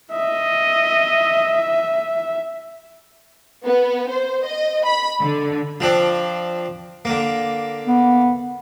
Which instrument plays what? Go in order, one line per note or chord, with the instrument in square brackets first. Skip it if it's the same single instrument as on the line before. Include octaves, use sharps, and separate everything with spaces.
[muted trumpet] D#5 [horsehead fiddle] E5
[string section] B3
C5
D#5
B5
D3
[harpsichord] F3 C4 D4
D3 A#3
[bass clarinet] B3